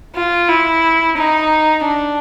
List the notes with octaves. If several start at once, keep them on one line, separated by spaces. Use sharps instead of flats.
F4
E4
D#4
D4